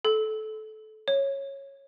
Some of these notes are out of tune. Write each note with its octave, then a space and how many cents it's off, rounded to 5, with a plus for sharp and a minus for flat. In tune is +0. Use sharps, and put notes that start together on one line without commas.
A4 -20
C#5 -10